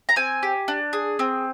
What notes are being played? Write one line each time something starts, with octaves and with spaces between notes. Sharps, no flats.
A#5
C4 G#5
G4
D4
G#4
C4